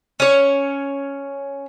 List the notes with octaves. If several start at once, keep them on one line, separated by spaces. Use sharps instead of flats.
C#4 C#5